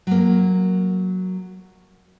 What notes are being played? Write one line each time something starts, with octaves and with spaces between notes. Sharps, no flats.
F#3 A#3